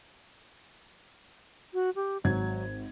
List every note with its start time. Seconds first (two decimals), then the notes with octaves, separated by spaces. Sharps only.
1.74 F#4
1.96 G4
2.24 G#1 F#3 G#6